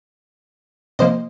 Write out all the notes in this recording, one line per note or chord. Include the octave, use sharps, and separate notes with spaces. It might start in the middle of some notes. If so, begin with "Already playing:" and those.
C3 F3 A#3 C5 D#5